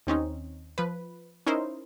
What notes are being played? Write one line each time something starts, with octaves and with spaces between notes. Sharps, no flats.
D#2 C4 C#4 D#4
F3 B4
C#4 D#4 E4 A#4 C5